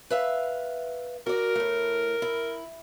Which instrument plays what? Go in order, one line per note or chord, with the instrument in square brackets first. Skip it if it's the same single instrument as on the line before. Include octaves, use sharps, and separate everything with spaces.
[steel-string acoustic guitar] B4 E5 F5
[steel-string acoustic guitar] F#4 D5 [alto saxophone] A#4
[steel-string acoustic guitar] A2 A3
E4